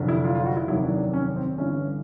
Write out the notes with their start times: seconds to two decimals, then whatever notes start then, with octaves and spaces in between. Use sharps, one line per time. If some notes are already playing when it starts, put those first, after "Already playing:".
Already playing: F1 F2 D3 F#3
0.08 E4
0.24 F4
0.35 F4
0.46 F#4
0.57 E4
0.68 F1 D#2 D#3 F#3 E4
0.83 D4
0.98 D4
1.13 C#4
1.36 C4
1.58 G1 G2 E3 C#4